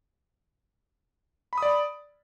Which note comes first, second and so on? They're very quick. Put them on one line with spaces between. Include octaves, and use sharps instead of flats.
B5 D#6 D5